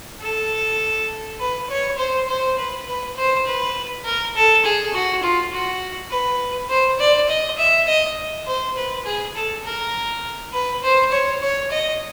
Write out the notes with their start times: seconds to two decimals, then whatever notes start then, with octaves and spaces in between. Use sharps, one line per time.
0.21 A4
1.39 B4
1.69 C#5
1.98 C5
2.28 C5
2.58 B4
2.87 B4
3.16 C5
3.46 B4
4.05 A#4
4.34 A4
4.64 G#4
4.93 F#4
5.22 F4
5.52 F#4
6.11 B4
6.69 C5
6.99 D5
7.29 D#5
7.58 E5
7.87 D#5
8.47 C5
8.76 B4
9.05 G#4
9.35 A4
9.64 A#4
10.53 B4
10.83 C5
11.12 C#5
11.41 C#5
11.70 D#5